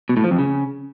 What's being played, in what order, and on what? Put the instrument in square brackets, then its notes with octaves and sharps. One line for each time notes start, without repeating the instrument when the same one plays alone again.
[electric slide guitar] B2
A2
F3
F2
C#3